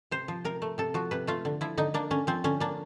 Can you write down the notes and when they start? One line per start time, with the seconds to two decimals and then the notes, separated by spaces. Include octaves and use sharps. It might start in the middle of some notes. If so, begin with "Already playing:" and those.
0.11 C3 C5
0.28 F3
0.45 C3 A#4
0.62 A3
0.78 C3 A4
0.94 F3 F#4
1.11 C3 B4
1.27 A3 F4
1.45 D3
1.61 F3 E4
1.77 D3 D#4
1.94 A#3 D4
2.11 D3 C#4
2.27 F3 C4
2.44 D3 C#4
2.60 A#3 D4